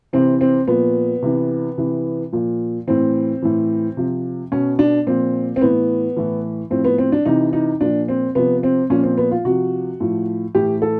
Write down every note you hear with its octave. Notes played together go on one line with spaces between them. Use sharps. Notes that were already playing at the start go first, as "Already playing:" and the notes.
C3 E3 C4
C4
A#2 F3 B3
C3 E3
C3 E3
A#2 F3
A2 E3 C4
A2 E3
C3 F3
B2 C#4
D4
A#2 F3 C4
C4
A2 E3 B3
A2 E3
A2 F3 C4
B3
C4
D4
C3 E3 D#4
D#4
A#2 F3 D4
C4
C3 F3 B3
C4
A#2 F3 C#4
C4
B3
F4
C3 F3 F#4
A2 F3
A2 E3 G4
A4